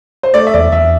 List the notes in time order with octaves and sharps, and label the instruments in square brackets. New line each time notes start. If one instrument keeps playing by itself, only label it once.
[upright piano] C5
[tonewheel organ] A3 [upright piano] D5
[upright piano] E5
[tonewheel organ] E2 [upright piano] D5
[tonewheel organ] E2 [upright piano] E5